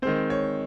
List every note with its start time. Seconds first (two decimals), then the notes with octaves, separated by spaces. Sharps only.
0.02 D#3 G#3 C4 C5
0.30 C#5